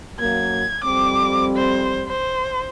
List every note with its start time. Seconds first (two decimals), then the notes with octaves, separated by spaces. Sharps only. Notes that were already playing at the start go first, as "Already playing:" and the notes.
0.20 F#2 F#3 A#3 G#6
0.84 F2 G3 C4 D6
1.57 C5
2.08 C5